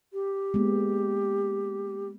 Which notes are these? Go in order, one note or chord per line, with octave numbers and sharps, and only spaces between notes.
G4
G#3 A#3 B3